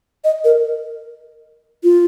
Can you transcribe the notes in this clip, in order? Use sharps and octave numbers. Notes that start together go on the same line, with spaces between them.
D#5
A#4
F4